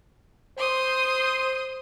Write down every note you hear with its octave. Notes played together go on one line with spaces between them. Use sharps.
C5 C6 D#6